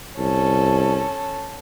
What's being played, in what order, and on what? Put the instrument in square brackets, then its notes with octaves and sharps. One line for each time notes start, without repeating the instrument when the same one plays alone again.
[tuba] C2 [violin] C#4 A4